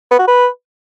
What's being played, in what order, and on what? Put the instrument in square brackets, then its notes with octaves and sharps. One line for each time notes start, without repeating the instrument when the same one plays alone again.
[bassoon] B3
F#4
B4